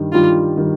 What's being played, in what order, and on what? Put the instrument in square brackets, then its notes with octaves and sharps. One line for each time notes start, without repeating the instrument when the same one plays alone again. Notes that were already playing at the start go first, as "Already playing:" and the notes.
Already playing: [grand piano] G2 D#3 G3
[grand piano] G2 D#3 G3 [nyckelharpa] F4
[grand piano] D#3 G3